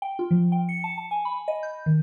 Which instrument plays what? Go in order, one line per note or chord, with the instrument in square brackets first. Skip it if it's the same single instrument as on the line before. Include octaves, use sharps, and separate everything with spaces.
[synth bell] G5
F4
F3
G5
C#7
A5
A5
G#5
B5
D#5
G6
D#3